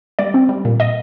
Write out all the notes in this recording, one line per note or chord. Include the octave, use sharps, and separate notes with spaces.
G3 D5
C4
G3
A#2
D#5